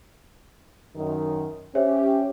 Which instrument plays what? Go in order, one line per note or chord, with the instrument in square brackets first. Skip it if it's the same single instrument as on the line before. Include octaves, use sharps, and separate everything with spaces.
[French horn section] F#2 D#3
[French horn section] C#4 G4 [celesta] C5 C#5 E5